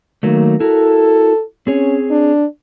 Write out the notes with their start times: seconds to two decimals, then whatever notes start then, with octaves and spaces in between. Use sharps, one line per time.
0.23 D#3 F#3 A3 A#3
0.60 E4 F#4 A4 A#4
1.67 C4 C#4 G#4 C#5
2.11 D4